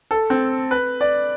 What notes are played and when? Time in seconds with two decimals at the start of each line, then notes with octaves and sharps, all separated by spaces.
0.11 A4
0.30 C4
0.71 B4
1.01 D5